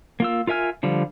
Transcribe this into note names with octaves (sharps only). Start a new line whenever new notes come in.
A#3 F4 E6
F4 A#4 E5 G#5 F6
D3 F3 G3